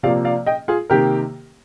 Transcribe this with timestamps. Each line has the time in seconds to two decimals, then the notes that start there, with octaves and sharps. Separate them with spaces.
0.03 C3 F3 A#3 D5 F5
0.25 D5 F5
0.46 D#5 G5
0.68 F4 G#4
0.90 C3 D#3 A#3 G4 A#4